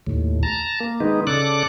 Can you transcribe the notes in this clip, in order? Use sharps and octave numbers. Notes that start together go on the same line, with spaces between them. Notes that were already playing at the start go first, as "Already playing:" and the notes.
D#2 A2
A5 A#5
A#3
D#3 G#3 B3 D#4
C#3 A4 D5 D6 F#6